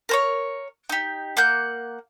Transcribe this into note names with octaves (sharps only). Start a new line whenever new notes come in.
A#4 C5 C#5
D#4 G4
A#3 F#5 G6